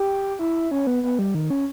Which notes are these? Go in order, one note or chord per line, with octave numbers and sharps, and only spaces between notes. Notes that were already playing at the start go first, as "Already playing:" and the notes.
Already playing: G4
E4
C#4
B3
B3
G3
D#3
C#4